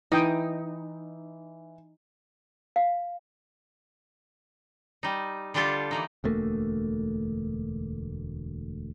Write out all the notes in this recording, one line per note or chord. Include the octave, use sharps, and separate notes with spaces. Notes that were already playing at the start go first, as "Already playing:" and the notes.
E3 D#4 E4 G5 D#6
F5
G3 D#4
D3 G3 D4 F4 G4 A4
E3 A#3 D#4
E1 D2 A3 A#3